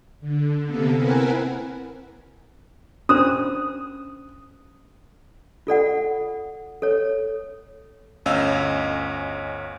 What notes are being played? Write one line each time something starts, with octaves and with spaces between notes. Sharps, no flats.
D3
C3 A#3 B3 A4
C4 E4 A#4 B4 F#5 G#5
C#4 D4 C5 D#6
F4 A4 D5 F#5
A4 C#5
G1 D2 C#4 D#5 F5 E6